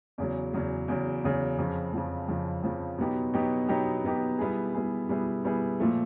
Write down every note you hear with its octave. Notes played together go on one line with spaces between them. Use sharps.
E2 C#3 F#3
E2 C#3 F#3
E2 C#3 F#3
E2 C#3 F#3
F2 C#3 F3
F2 C#3 F3
F2 C#3 F3
F2 C#3 F3
B2 F#3 B3 D#4 G4
B2 F#3 B3 D#4 G4
B2 F#3 B3 D#4 G4
B2 F#3 B3 D#4 G4
B2 G3 B3 E4 G#4
B2 G3 B3 E4 G#4
B2 G3 B3 E4 G#4
B2 G3 B3 E4 G#4
A#2 F3 A3